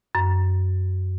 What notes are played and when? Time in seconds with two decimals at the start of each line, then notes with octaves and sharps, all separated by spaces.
0.15 F#2